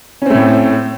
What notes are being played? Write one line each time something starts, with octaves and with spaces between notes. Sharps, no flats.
A2 A3 C4 C#4